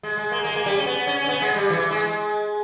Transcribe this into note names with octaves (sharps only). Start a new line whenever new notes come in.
G#3
G#3
A#3
G#3
A#3
G3
C#4
B3
C#4
C#4
B3
G#3
G3
E3
G#3